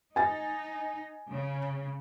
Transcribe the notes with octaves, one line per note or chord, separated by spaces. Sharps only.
D#4 G#5 A6
C#3